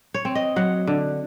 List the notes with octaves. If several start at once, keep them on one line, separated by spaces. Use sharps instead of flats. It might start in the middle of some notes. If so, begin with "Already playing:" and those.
C#5
C4
D#5
F#3 F#5
D3